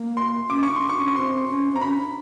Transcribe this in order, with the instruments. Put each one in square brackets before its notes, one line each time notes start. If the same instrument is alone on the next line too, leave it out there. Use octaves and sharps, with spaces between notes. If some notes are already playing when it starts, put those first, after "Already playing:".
Already playing: [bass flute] A#3
[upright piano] C6
[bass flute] C#4 [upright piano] D6
[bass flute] D4 [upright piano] C#6
[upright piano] C6
[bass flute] D4
[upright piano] C#6
[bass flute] C#4
[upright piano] C#6
[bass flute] C4 [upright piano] C6
[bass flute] C#4
[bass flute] C4 [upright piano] A#5
[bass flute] C#4 [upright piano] B5
[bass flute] D4